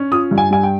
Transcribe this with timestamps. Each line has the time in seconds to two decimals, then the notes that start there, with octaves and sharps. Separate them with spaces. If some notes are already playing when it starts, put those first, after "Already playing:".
Already playing: C#4
0.12 F4 D#6
0.31 G2
0.38 G#5
0.50 G3 G#5
0.63 G5